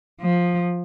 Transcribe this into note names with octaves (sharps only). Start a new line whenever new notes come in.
F3